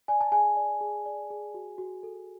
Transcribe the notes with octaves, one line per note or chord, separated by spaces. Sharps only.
D5 G#5
A5
G#4 G#5
D5
G#4
D5
G#4
F#4
F#4
A4